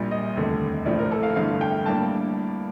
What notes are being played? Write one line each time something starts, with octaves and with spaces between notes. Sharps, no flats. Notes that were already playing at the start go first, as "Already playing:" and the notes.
Already playing: A#1 A#2 G3
D#5
F1 D#2 D3 A3
A#1 A2 F3 D5
A#4
A4
F5
G1 G2 D3 A3 F5
G5
A2 G3 A#3 D4 A5